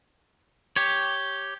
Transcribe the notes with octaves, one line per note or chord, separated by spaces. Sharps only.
G4 C#5